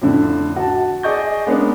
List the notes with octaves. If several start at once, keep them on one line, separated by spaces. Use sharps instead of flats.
F2 A2 D3
F#4 A5
G#4 D5 D#5 C#6 G6
G#3 A#3 B3 C#4 D4